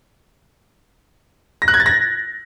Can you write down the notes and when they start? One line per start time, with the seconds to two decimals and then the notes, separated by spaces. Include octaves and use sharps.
1.62 A#6
1.68 F#6
1.74 G#6
1.80 A6
1.86 A#6